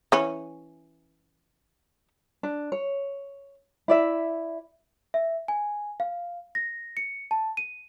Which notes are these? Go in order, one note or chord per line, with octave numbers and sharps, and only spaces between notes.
E3 C#4
D4
C#5
E4 D5 E5
E5
G#5
F5
A#6
C#7
A5
D#7